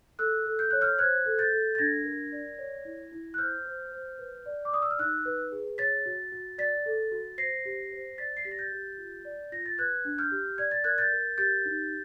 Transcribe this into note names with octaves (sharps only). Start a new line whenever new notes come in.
A4 E6 F#6
A4
G6
C#5 F#6
F6 G6
C5 F#6 G#6
A4
G6 A6
A4
A6
D4 G#6 A#6
A#4
D5
C#5
E4
E4
F#6
C5 F6 G6
C5
C5
B4
D5
D6
D5 D#6
E6
F6
D#4 E6 F#6
B4
G#4
C#5 A6 B6
F#4
F#4
D5 A6 B6
A4
F#4
C5 A#6 C7
G4
C5
D5 A6 B6
C7
G4 B6
A#6
G6 A6
G4
F4
D5
F4 A#6
A6
B4 F#6 G#6
D4
F6 G6
G4
D5 G#6
A6
A#4 F#6 G#6
G6 A6
A#4
G4 G6 A6
D#4